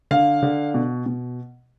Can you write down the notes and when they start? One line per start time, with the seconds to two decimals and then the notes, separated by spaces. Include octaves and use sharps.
0.11 D3 F5
0.43 D3
0.74 B2
1.06 B2